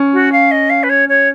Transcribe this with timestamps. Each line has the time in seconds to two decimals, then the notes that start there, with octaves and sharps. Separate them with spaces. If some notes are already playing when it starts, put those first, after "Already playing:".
Already playing: C#4
0.13 F#4
0.32 F5
0.51 D#5
0.69 F5
0.83 B4
0.89 C#5
1.08 C#5